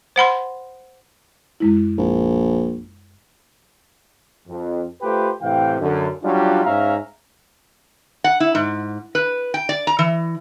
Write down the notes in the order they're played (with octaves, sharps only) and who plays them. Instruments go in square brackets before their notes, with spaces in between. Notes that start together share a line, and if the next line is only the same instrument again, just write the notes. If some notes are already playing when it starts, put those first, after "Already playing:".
[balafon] C5 F#5 B5 C6
[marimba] F#2 G#3 E4
[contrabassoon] A#1
[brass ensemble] F2
A3 F4 G4 B4 C5 G5
A2 C3 E3 F5 G5
F#2 D3
F#3 G3 C#4 D4 F4
G#2 C#4 E5 F5 A#5
[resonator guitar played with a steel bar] F#5
E4
G#2
B4
G5
D5
A#5
E3